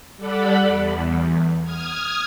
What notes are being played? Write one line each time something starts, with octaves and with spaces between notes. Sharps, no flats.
G3 A4 D5 F#5 B5
E2
D#6 F6 G#6